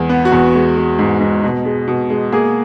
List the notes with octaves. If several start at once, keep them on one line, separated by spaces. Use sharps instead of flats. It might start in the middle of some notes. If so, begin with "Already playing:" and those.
Already playing: E2 G#3
B3
F#4
E2
G#3
G#3
G#2
G#2
B2
G#3
B2
G#3
A#3 G#4